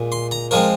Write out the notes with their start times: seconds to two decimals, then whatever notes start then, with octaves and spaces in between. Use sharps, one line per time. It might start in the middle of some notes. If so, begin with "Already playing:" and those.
Already playing: A#2 G#3
0.12 C6
0.31 A#5
0.51 F3 G#3 C4 A#4